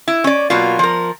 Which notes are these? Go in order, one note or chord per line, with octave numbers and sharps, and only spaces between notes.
E4
C#4 D5
B2 F#3 A#3 F4
F3 A#4